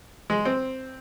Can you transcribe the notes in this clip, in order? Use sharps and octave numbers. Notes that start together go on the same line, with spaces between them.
G#3
C4